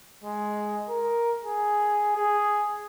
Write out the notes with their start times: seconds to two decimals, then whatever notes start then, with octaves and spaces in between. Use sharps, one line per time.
0.24 G#3
0.89 A#4
1.44 G#4
2.16 G#4